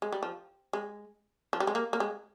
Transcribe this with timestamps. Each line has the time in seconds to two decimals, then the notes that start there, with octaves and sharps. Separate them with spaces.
0.02 G#3
0.12 G3
0.23 F3
0.73 G#3
1.53 F3
1.60 G3
1.67 G#3
1.75 A#3
1.93 A#3
2.00 G#3